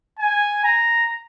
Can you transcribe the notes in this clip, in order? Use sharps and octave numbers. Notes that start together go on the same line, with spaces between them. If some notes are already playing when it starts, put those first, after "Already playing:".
G#5
A#5